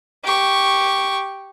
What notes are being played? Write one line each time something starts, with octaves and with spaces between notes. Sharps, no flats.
G4 C#6